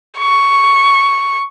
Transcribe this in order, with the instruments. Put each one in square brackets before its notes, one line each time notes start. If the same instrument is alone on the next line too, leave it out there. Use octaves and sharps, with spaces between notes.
[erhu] C#6